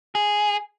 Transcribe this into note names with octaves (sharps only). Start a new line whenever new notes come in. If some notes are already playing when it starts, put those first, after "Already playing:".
G#4